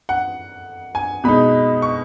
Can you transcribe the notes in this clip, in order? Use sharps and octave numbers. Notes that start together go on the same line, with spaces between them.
F#5
G#5
B2 G#3 D#4 B5
C#6